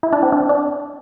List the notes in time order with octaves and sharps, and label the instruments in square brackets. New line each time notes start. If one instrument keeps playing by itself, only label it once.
[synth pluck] E4
D4
C4
D4
D4